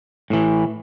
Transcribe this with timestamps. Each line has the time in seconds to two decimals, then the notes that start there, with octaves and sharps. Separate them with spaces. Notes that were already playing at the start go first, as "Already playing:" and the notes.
0.30 A2 E3